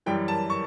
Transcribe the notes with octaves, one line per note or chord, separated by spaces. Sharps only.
F#2 E3 G3 G5
A5
C#6